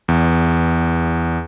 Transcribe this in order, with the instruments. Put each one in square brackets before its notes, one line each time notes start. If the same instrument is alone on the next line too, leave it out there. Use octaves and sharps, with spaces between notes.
[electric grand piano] E2